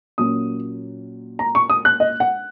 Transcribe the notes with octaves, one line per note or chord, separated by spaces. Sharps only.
A#2 F#3 A#3 C#4 D#6
A#5
C#6
D#6
F#6
D#5
F#5